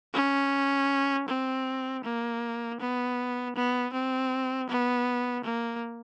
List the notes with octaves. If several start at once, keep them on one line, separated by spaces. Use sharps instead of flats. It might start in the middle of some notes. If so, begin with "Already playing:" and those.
C#4
C4
A#3
B3
B3
C4
B3
A#3